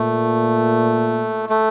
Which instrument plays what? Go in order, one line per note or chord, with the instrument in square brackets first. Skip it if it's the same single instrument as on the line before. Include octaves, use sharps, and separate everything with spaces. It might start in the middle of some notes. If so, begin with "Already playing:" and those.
Already playing: [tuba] A#2 [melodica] A3
[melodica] A3